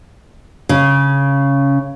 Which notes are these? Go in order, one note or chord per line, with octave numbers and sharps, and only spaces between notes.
C#3